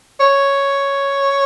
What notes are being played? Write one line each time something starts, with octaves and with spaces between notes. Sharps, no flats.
C#5